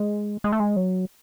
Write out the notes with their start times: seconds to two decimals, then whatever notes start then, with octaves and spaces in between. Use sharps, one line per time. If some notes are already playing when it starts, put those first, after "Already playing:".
Already playing: G#3
0.44 G#3
0.52 A3
0.60 G#3
0.76 F#3